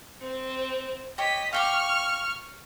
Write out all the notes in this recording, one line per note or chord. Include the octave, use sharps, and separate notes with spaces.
C4
G4 C#5 D#5 B6
F5 G5 C#6 D6 F6